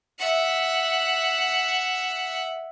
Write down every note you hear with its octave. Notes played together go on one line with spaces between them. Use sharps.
E5 F#5